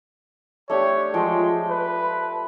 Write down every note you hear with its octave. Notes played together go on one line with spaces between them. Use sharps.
A3 D4 G4 C#5
F3 G#3 G5 C#6
B4